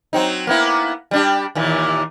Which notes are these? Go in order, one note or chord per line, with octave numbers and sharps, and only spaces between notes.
F#3 C4 D#4
A#3 B3 E4
G3 D4 G4
D#2 A#2 E3